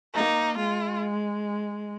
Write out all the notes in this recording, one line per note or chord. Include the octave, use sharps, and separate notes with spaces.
A#3 D#4
G#3 F4